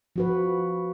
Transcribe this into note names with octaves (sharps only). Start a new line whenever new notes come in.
F3 F#4 B4